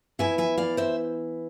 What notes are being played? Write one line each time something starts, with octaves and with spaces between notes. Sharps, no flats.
E3 B3 E4 E5 G#5
E5 G#5
D5 F5
C5 E5